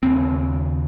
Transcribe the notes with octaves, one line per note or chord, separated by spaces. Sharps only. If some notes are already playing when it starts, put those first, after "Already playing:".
D#2 C#3 C4